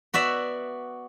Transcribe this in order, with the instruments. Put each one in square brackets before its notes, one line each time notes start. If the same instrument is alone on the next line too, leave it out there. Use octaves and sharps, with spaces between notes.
[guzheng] B3 F#4 D5 E5